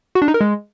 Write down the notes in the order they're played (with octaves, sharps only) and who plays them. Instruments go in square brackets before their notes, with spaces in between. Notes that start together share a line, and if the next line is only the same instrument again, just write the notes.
[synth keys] F#4
D4
D#4
A#4
G#3